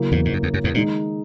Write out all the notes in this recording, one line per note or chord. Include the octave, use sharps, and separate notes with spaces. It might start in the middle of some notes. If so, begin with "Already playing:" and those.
Already playing: C#3 F#3 A#3 C#4 E4
E2 G#2
G#2
F#2
E2
F#2
E2 G#2
A#2 D#3 G#3 D#4